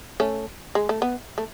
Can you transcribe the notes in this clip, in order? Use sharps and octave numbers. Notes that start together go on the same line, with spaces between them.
A3 C#4
G#3
A3
B3
A3